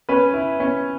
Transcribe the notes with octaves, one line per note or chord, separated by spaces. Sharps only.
C#4 B4
E4
C#4